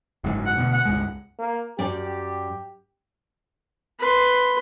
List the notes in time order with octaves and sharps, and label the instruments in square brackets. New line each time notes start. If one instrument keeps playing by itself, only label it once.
[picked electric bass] F#1 G#2 F#3
[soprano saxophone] F#5
[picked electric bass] D2 B2 B3
[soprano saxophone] F#5
[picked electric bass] C#2 G2 G#3
[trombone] A#3
[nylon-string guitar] F#2 D5 [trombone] G4
[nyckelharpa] B4 C6